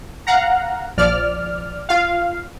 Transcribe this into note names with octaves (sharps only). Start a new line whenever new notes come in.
F5 F#5 A#5
A#1 F3 D5 F6
F4 F5